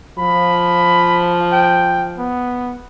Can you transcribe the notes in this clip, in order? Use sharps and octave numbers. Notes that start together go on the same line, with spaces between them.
F3 B5
G5
B3